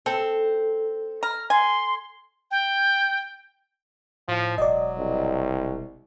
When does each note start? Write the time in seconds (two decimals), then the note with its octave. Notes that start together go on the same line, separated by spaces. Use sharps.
0.06 C4 A4
1.23 A#5 F6
1.50 G#5 C6
2.51 G5
4.28 A2 F3
4.58 E1 F#3 D5 D#5
4.97 C2